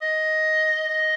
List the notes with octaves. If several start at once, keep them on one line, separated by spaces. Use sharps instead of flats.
D#5
D#5